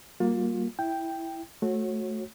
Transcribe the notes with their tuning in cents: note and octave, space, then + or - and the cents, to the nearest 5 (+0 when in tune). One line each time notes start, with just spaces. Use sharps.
G3 -30 A#3 +0 F4 +30
E4 +0 G5 +0
A3 -10 F#4 -10 C#5 -30